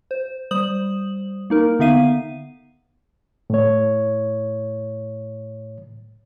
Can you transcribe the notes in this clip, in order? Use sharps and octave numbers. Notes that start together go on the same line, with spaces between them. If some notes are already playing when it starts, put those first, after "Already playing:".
C5
G3 C5 D#6 F#7
A#3 D#4 A#4
D3 B3 D#4 E5 F5 D#7
A2 C#5